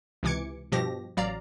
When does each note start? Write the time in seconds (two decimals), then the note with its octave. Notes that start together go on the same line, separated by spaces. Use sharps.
0.23 C#2 C3 E3 D6 G#6 C#7
0.72 G2 B2 F3 G4 A#6
1.17 A1 F#3 D5 F5 A#5